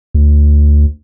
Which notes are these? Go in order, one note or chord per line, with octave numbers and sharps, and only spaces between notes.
D2